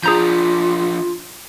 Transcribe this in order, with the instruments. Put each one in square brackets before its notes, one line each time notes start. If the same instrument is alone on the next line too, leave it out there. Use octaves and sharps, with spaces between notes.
[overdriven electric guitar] F3 D4 [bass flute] F4 [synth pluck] G#4 A#5 G6